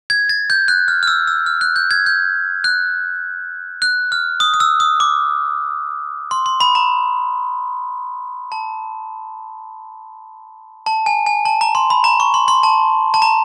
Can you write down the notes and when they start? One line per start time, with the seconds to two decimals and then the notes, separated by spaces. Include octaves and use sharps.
0.10 G#6
0.29 A6
0.50 G6
0.68 F#6
0.88 F6
1.03 F6
1.07 E6
1.27 E6
1.46 F6
1.61 F#6
1.76 G6
1.91 G#6
2.06 G6
2.64 F#6
3.82 F#6
4.12 F6
4.40 D#6
4.54 D#6
4.60 E6
4.80 D#6
5.00 D6
6.31 C6
6.46 C6
6.60 B5
6.75 A#5
8.52 A5
10.86 A5
11.06 G#5
11.26 G#5
11.45 A5
11.61 A#5
11.75 C6
11.90 B5
12.04 A#5
12.20 C#6
12.34 C6
12.48 C6
12.63 A5
13.14 A5
13.22 A#5